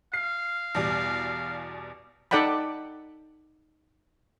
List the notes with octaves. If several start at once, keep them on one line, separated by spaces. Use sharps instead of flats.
F5 C7
E2 B2 G3
D#4 A4 D5 F#5 G5 B5